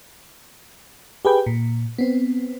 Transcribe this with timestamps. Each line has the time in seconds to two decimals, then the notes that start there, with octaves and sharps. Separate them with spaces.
1.25 G4 G#4 B4 G5
1.46 A#2
1.98 B3 C4